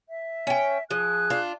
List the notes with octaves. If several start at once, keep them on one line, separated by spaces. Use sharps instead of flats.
E5
C#4 G5
F3 G#4 F#6
D4 F4